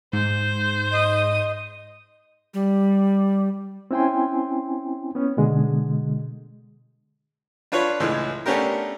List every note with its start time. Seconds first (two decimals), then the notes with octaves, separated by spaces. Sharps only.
0.13 G#2 C5
0.93 D#5 D#6
2.54 G3
3.91 C4 C#4 E4 G5 G#5 C6
5.15 B3 C#4
5.37 B2 D3 G#3
7.72 D4 F4 B4 C#5
8.00 C#2 A2 E3 G#3
8.46 A3 B3 C#4 D4 G4 A#4